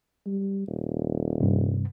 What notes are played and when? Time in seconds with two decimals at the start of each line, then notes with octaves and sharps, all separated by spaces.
0.26 G3
0.68 D#1
1.40 G2 C3